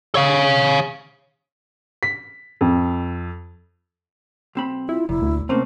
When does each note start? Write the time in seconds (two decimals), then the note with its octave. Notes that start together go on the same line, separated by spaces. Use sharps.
0.15 C#5 F5
2.03 B6
2.61 F2
4.55 B1 C4 B5
4.89 E4 F4
5.09 F1 A#2 E4
5.22 D2
5.49 C3 A3 A#3 C4 C#4